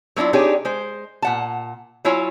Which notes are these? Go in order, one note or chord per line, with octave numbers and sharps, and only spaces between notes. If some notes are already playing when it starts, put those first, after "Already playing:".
F#3 A#3 D4 E4 F4
C4 D4 D#4 G4 G#4 C#5
G#3 C5
A#2 F#5 A5
F#3 E4 F4 C#5 G#5